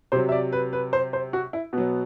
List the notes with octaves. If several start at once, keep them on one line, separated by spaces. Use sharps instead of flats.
C3 F#3 C5
E5
D5
B4
B4
C5
C5
F#4
E4
B2 F#3 B3